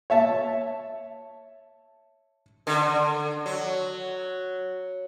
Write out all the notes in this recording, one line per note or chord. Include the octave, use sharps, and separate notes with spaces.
C#5 E5 A5
D3
F#3